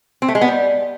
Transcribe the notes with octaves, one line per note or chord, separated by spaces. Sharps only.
C4
A3
G#3
B3
G3